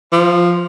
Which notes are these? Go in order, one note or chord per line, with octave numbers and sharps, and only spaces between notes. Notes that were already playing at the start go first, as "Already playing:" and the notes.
F3